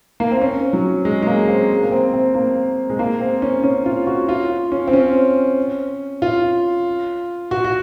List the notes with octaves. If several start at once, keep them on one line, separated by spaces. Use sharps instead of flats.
A#3
C4
C#4
F#3
G#3
G#3
A#3
C4
A#3
C4
C4
A#3
G#3
A#3
C4
C#4
C#4
F4
F#4
F4
C#4
C4
C#4
F4
F#4
F#4